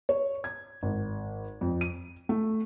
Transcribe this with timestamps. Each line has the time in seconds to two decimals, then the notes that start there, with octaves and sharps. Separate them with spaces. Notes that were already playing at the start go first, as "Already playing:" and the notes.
0.09 C#5
0.44 G#6
0.83 G#1
1.61 F2
1.81 D#7
2.29 A3